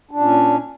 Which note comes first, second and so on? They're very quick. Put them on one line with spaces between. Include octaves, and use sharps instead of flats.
D4 A#2 C#4